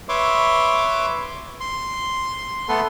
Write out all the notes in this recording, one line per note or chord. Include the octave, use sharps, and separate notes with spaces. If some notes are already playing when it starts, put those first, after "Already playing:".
B4 C#5 E5 C6 D6
C6
A3 B3 A4 B4 C6